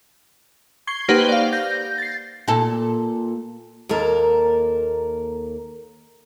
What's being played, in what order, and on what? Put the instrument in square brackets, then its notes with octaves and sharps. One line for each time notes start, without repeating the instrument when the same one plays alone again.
[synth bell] C#6 G#6 C7 G7
A#3 D#4 G4 B4 C5 F#5
D5 F5
G6 A#6
A6 C7
[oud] A#2 A4
[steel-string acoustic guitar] D#2 A#3 A4 A#4